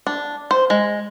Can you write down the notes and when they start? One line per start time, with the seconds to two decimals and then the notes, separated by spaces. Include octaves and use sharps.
0.07 D4
0.51 C5
0.70 G#3